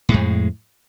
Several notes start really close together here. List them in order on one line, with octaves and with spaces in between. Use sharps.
A2 G#3 F2